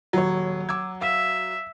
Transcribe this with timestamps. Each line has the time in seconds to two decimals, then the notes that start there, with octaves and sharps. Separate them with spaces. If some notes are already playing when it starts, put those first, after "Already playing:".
0.13 D#1 F#3 C#5
0.69 D6 E6 G#6
1.01 E5 F5 E6